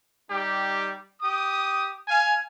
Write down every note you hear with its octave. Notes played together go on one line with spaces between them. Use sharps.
G3 D#4 G4
G4 D#6
F5 G#5